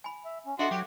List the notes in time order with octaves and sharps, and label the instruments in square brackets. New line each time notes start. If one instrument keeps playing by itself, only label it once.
[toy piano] G#5 B5
[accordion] E5
C#4
[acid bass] D4 [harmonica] F#4 C6 [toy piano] A4 E5 [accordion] D#5
[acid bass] F#3 [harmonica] G4 [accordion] G5